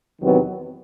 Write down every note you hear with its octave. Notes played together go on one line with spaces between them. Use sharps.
E2 C3 D#3 F#3 B3